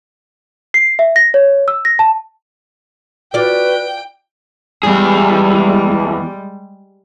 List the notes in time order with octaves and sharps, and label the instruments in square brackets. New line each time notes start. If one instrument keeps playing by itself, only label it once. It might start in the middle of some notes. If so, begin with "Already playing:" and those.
[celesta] C7
E5
A#6
C#5
E6
A#6
A5
[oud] F4 D5 [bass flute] F#4 [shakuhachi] B4 [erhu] G5
[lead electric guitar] E2 G#4 [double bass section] G3 G#3